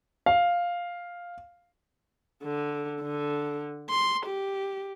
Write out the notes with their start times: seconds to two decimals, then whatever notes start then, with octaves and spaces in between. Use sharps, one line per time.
0.26 F5
2.43 D3
3.01 D3
3.90 C6
4.26 G4